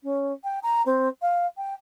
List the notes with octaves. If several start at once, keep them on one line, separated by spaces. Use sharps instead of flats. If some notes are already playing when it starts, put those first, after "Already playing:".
C#4
G5
A#5
C4
F5
G5